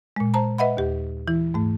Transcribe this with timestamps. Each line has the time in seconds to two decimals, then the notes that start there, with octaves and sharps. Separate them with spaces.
0.16 A#2 G#3
0.34 C5 A5 A#5
0.58 B4 D#5 E5 F#5 B5
0.77 D#2 G4
1.28 E3 E4
1.54 G#2 A3